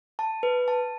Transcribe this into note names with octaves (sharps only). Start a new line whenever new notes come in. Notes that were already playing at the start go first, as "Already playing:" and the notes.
A5
B4
A5